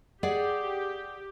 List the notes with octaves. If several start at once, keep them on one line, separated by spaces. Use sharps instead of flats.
G4 G#4 D5 F#5